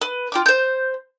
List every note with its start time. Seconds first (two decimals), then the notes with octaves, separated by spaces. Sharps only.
0.01 B4
0.32 F4 G5 D6
0.46 C5 G6